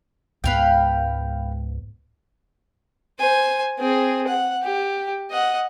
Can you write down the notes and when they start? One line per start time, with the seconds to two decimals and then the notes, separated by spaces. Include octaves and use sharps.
0.44 C#2 G#2 B3 B4 F5 G5
3.19 C5 G#5
3.78 C4 G#4
4.27 F#5
4.63 G4
5.31 D#5 F#5